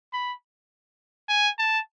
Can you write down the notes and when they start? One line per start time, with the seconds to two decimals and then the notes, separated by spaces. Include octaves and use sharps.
0.13 B5
1.29 G#5
1.59 A5